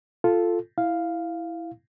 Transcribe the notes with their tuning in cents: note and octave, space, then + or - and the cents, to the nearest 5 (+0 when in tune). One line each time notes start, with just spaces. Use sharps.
F4 +0 A4 +0
E4 +0 F5 +0